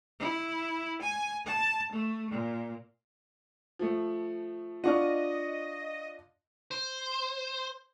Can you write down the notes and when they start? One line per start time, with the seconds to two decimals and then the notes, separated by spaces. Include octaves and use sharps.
0.19 E4
1.01 G#5
1.46 A5
1.91 A3
2.30 A#2
3.79 F3 A3
4.84 D4 F4 D#5 F#5 C#6 F6
6.71 C5